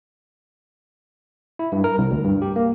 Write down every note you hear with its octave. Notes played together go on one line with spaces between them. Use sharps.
E4
G2
A#4
C2
D2
G2
G4
A#3